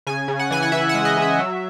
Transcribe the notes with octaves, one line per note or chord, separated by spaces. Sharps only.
C#3 G#5
C#3
F#5
E3 G#5
F#5
E3 E5
F#5
G#3
D#5
C#3
E5
F#3